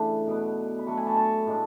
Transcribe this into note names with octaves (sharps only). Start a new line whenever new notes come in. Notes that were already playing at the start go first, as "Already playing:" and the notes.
Already playing: C#3 E3 A3 D4 B5
B2 F#3 B3
B5
F#3 A3 D4 A5 C#6
G#5 B5
A5 C#6
A5 C#6
A2 G#3 D4